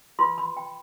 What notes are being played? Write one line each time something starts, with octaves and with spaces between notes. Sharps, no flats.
F4 B4 C6
B5
G5